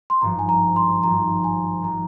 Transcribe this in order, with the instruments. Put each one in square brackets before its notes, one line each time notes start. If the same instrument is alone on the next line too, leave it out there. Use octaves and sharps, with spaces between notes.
[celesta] C6
[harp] G#1 G2 F3 [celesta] A#5
[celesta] G#5
A#5
C6
[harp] G#1 G2 F3 [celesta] A#5
[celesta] G#5
[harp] G#1 F3 [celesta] A#5